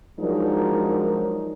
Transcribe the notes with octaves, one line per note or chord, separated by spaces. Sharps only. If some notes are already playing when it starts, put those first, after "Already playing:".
F3 F#3 G#3 D4 D#4 A#4